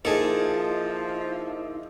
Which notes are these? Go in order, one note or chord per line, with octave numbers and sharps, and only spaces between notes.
F3 A#3 D#4 E4 G#4 A4 A5